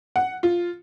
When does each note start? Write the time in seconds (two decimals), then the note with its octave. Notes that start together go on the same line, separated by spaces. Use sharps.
0.16 F#5
0.43 F4